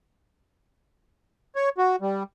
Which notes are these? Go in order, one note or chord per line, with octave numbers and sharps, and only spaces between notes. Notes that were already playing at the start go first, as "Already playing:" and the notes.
C#5
F#4
G3